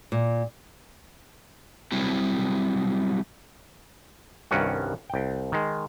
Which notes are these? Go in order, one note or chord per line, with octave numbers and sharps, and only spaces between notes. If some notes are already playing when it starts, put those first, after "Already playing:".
A#2
F#3 G3 C4 E4
C2 G2 D#3 C#4 F#4
C2 G5
D#3 G#3